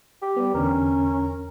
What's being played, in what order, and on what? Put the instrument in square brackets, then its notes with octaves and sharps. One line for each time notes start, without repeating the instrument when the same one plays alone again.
[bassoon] G4
[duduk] G3 [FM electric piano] B3
[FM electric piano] E2 D3 [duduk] C#4 [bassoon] A#4